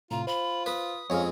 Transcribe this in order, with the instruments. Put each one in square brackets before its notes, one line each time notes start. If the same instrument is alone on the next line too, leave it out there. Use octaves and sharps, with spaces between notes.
[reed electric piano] A2 C3 [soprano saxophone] F4 [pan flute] A#5
[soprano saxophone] F4 [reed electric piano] C5 [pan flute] B5
[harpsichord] B4 [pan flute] D#6
[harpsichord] F2 G#3 [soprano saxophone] C#4 [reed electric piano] C#5 F5